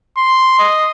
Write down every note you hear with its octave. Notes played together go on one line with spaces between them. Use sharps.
C6
D#5